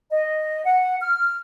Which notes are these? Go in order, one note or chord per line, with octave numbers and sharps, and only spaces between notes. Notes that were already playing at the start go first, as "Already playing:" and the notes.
D#5
F#5
F6